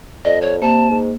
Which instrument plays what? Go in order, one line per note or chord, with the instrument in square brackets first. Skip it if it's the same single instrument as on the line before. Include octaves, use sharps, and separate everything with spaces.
[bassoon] F2 [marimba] D5 [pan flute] D#5
[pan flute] C#5
[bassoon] C3 [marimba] A#3 [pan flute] A5
[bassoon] G#2